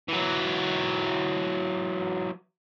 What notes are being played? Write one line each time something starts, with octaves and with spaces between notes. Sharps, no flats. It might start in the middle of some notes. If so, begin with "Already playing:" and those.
E3 F#3